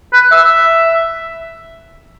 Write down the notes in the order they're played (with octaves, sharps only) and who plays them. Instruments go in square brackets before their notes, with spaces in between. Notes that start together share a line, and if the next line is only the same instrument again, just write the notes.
[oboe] B4
E5